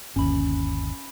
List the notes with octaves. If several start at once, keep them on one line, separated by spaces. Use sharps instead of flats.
G1 D#2 C#4 B5